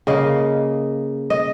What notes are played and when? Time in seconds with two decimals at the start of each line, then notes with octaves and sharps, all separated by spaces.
0.07 C#3 A#3 D#5
1.30 D#5